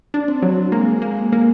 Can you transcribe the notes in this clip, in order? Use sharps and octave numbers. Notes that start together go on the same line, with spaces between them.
D4
C4
F#3
G#3 A#3
A#3
A#3